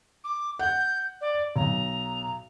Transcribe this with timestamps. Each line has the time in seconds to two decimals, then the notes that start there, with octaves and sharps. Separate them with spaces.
0.24 D6
0.59 F#5 G6
1.21 D5
1.56 B1 A#5